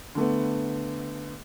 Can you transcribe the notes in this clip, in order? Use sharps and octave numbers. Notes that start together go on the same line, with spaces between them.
D3 A3 B3